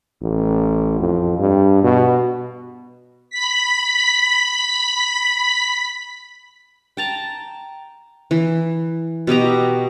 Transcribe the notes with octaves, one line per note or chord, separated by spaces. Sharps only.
A1
F2
G2
B2
B5 B6
G5 A5 A#5
E3
B2 G4 D#5 A#5